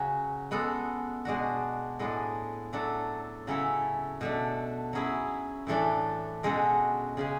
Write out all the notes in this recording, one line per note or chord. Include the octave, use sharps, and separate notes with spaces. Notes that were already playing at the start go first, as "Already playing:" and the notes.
Already playing: C#3 F#3 C#4 F#4
G#3 B3 F#4 A4
B2 G#3 D4 F#4
A2 G#3 B3 D4
F#3 A3 D4 A4
C#3 F#3 C#4 E4 A4
B2 A3 D4
F#3 C#4 E4 G#4
A2 E3 A3 D4 A4
B2 G#3 C#4 F#4 A4
C#3 G#3 C#4 G#4